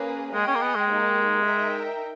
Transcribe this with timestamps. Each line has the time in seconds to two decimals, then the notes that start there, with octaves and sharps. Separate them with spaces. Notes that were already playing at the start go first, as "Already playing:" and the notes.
Already playing: A#3 C#4 G#4 B4
0.33 G#3 G#4 D#5 G5
0.47 C#4
0.55 A#3
0.61 B3
0.75 G#3
0.89 A#3 D#4 G4
1.46 D#4 A#4 E5 G5